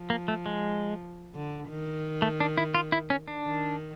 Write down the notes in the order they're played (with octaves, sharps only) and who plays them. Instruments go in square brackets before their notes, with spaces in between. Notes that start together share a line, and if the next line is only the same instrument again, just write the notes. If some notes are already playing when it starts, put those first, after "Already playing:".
Already playing: [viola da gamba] F3
[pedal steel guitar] A#3
A3
G#3
[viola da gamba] D3
D#3
[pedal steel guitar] A3
D4
E4
F4
E4
C#4
D4
[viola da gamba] D#3